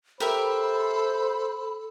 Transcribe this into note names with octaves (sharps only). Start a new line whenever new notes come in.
G4 A4 A#4 C5 E5 B5